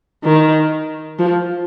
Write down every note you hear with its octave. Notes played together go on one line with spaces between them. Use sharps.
D#3
F3